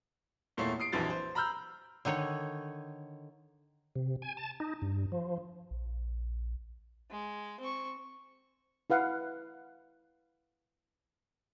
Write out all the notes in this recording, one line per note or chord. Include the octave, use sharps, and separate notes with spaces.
E2 A#2 A3 E4 C#5 C7
D#6 C7 D7
A#1 F2 E3 F#3 A6
C5
A#5 B5 E6 F6 G6
D3 D#3 D#4 C#5
C3
G#5
A5
D#4
G2
F3
A#1
G#3
C4 C#6
E4 B4 F5 F#5